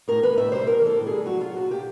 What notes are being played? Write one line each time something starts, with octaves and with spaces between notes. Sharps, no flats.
A2 A#4
E3 B4
A2 E5
G3 C5
A2 A#4
E3
A4
A2
G3 G#4
F#3 F#4
F#3 F4
A#2 F#4
A#2 G4